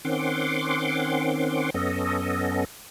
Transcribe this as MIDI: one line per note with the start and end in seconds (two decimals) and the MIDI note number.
0.05 1.70 51
0.05 1.70 60
0.05 1.70 61
0.05 1.70 78
0.05 1.70 84
0.05 1.70 86
1.74 2.65 42
1.74 2.65 59
1.74 2.65 61
1.74 2.65 69
1.74 2.65 75